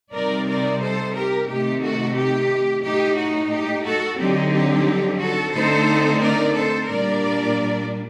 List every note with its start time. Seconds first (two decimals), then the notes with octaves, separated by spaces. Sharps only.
0.13 C3 G3 C4 D#4 A#4 D5
0.47 A#4 D5
0.80 A4 C5
1.14 G4 A#4
1.47 C3 D#3 A3 C4 D#4 G4
1.81 F#4 A4
2.16 G4
2.83 A2 A3 D#4 G4
3.17 F#4
3.51 G4
3.85 F#4 A4
4.18 D3 F#3 C4 D#4 G4
4.52 G4
5.20 F#4 A4
5.54 D3 A3 C4 D#4 A4 C5
6.21 A#4 D5
6.55 A4 C5
6.89 A#2 G3 D4 A#4 D5